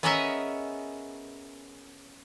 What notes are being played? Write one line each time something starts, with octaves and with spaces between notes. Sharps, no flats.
B3 C#4 G#4 A#4 D#5 E5